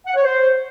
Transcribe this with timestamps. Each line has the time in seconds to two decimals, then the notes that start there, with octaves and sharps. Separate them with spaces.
0.07 F#5
0.15 C#5
0.24 C5